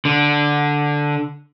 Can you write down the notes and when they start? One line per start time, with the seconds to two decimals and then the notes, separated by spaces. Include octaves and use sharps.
0.05 D3